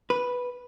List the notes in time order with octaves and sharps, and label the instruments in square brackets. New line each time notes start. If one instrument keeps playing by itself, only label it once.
[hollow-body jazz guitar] B4